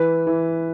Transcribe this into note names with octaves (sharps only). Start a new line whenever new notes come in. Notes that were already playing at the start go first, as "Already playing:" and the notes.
Already playing: E3 B4
E3